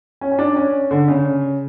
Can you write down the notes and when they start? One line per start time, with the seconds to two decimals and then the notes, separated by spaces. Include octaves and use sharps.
0.21 C#4
0.32 C#4
0.39 D4
0.56 C#4
0.91 D3
1.08 C#3